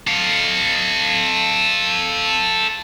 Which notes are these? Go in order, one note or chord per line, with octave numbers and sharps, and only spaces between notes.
A4 F5